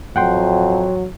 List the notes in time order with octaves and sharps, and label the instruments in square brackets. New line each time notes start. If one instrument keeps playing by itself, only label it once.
[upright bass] A1 [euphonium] F2 [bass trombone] F#3 [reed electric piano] F#5 G5 C6